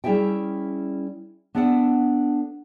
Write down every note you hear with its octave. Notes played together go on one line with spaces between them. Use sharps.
G3 C#4 E4 G#4 E5 G5
B3 D4 A4 E5 F#5